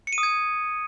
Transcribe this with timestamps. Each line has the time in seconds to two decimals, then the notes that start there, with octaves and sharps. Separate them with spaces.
0.07 C#7
0.13 D#7
0.18 D#6
0.23 G#6